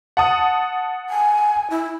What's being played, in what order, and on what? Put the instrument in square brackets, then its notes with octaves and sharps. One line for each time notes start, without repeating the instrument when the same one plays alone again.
[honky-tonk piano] F#5 A5 D#6
[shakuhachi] G#5
E4